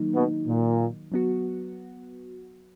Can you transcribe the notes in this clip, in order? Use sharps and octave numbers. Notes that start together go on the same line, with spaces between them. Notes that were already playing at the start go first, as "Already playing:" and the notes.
Already playing: D#3 F#3 A#3 D#4
B2
A#2
F#3 B3 F#4